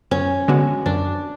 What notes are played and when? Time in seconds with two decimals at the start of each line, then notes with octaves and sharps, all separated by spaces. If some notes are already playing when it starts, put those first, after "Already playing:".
0.11 F#2 C#4
0.48 D3 G#3 B3 F#4
0.86 F#2 D4